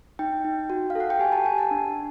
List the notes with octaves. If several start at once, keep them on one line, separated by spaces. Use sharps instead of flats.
D#4 G5
D#4
F#4
F5
A4 F#5
G5
G4 G#5
A5
G4 G#5
A5
D4